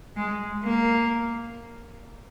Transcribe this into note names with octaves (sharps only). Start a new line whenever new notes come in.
G#3
A#3